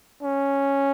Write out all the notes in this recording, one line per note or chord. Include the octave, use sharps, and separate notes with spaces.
C#4